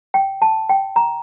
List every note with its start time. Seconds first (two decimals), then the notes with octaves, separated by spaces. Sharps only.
0.14 G5
0.42 A5
0.69 G5
0.96 A#5